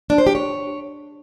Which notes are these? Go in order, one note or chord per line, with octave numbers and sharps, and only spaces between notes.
D4
C5
G4
C#5